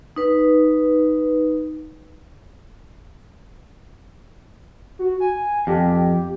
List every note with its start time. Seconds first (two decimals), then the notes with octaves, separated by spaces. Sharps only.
0.16 D#4 B4
4.99 F#4
5.20 G#5
5.67 F2 G4